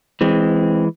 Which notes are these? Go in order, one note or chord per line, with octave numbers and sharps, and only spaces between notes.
E3 G#3 C4